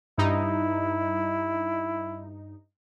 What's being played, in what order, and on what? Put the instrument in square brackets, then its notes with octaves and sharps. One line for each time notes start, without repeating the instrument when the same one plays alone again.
[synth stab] G2 D#4 [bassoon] E4